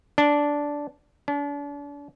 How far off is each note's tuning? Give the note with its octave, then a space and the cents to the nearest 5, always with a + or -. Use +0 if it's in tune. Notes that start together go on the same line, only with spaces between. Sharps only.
D4 -10
D4 -40